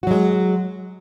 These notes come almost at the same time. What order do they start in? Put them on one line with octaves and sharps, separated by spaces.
F#4 F#3 G#3